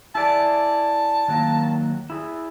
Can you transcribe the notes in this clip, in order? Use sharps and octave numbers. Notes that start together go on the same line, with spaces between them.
E4 G#4 D5 A5
D#3 F#3 A#3
E4 G#4